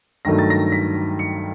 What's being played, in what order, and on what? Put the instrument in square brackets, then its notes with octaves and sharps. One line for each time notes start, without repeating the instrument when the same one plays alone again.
[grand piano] G2 D#3 F#3 A3 A#6
A6
A#6
B6
C#7